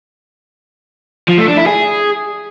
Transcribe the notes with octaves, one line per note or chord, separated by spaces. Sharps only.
F3
A3
D4
E4
G#4